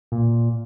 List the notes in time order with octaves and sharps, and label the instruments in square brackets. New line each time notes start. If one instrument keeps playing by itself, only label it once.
[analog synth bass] A#2